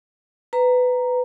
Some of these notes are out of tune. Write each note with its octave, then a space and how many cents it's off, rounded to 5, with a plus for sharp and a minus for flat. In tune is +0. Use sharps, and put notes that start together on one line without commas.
B4 +15 A#5 +0